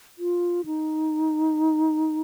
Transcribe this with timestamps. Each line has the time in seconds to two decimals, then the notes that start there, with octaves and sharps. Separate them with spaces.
0.19 F4
0.65 D#4